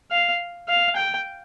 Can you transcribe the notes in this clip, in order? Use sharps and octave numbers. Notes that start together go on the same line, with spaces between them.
F5
F5
G5